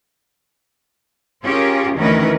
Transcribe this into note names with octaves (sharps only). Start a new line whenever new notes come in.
C#4 F4 G4 G#4 A#4
D2 D#3 E3 C#4 A#4 B4